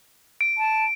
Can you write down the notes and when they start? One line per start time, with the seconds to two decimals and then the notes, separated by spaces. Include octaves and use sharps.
0.41 D7
0.58 A5